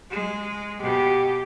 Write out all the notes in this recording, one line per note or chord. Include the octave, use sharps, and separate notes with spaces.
G#3
B2 G4